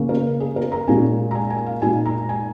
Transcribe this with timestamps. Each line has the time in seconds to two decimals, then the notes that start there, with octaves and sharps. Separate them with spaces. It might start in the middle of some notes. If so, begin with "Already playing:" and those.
Already playing: C#3 A#3 C#4
0.09 A#4
0.40 G#4
0.56 A#4
0.72 A#5
0.87 A#2 G#3 C#4 G#5
1.31 A#5
1.35 G#5
1.50 G#5
1.66 F5
1.82 A#2 G#3 D#4 G#5
2.06 A#5
2.29 G#5